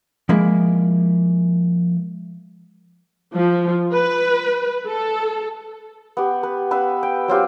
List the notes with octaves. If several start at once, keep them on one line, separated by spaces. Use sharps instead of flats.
F3 G#3 A#3 E4
F3
B4
A4
B3 G4
B4
B3 B4 E5 F5
G5
F#3 C4 F4 G4